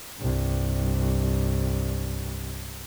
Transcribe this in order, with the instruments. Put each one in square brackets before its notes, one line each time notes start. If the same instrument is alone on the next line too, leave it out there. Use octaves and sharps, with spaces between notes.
[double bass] C2 G2